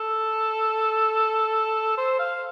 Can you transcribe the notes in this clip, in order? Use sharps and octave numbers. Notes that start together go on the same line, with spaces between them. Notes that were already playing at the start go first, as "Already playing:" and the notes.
Already playing: A4
C5
F5